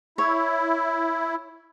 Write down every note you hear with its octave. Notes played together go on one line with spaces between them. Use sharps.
E4 C#5